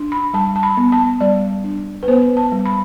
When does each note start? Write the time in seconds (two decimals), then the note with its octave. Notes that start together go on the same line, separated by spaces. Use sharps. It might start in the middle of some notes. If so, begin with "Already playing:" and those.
Already playing: D4
0.12 B5
0.33 G3 A5
0.56 A5
0.63 B5
0.77 B3
0.92 A5
1.20 G3 D5
1.64 D4
2.03 B4
2.08 B3 C5
2.37 A5
2.52 G3
2.65 B5